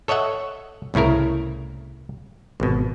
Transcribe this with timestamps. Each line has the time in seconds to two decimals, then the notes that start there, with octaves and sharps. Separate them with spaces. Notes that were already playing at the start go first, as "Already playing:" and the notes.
0.08 A4 C#5 D#5 E5 F#5
0.94 C2 A2 C#3 E4 A#4
2.60 G#1 B2